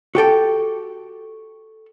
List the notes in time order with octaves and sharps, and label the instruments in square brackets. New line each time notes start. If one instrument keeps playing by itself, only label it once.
[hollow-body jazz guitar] F#4 G4 A4 G5